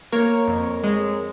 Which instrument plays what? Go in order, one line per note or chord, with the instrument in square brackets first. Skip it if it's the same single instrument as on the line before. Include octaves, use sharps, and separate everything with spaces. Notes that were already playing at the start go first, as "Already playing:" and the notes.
[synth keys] A#3 A#4 C#5
F2
G#3